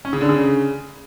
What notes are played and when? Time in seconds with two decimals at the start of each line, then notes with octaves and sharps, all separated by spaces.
0.05 C#4
0.13 C#3
0.21 D3
0.29 C#3